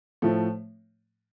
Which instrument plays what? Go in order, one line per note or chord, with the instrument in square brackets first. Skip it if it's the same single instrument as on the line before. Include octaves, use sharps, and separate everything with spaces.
[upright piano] A2 F3 A3